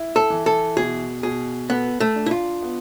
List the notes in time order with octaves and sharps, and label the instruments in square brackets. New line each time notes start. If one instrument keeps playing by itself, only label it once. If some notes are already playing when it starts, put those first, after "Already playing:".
Already playing: [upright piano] E4
[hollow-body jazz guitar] A4
[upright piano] E3
[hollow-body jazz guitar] A4
[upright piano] B2 [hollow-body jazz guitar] G#4
[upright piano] B2 [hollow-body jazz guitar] G#4
[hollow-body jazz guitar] B3 [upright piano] A4
[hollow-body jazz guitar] A3
[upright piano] D4
[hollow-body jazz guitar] E4
F4
[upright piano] B3